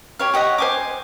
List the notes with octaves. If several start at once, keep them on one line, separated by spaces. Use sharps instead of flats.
G4 C#5 F5
G4 C#5 D#5 F#5
C5 G#5 D6